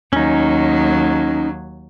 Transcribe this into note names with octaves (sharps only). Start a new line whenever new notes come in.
D#2 F#3 C#4 D#4